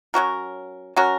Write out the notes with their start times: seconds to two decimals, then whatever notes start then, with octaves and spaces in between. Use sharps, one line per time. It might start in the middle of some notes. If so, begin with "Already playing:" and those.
0.14 F#3 C#4 F#4 A#4
0.96 F#3 C#4 F#4 A#4